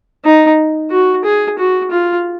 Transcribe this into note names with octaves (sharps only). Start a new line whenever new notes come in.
D#4
F#4
G#4
F#4
F4